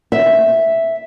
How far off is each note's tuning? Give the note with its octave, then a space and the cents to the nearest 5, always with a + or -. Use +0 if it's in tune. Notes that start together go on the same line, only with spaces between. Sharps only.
E5 +0